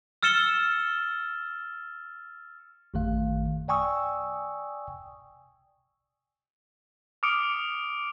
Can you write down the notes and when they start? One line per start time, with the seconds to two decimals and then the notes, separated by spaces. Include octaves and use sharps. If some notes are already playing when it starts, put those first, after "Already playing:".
0.23 E6 F6 A6 C#7 E7 G7
2.94 A1 F#2 D#3 A3 F5
3.68 D5 G5 G#5 C#6 D#6 E6
7.23 D6 D#6 F6 C#7 D7